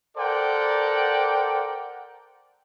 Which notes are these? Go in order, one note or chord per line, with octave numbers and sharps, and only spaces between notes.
A4 A#4 C5 D5 F#5 G5